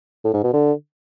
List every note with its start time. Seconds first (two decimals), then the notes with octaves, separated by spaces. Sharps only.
0.24 A2
0.34 G#2
0.43 B2
0.53 D3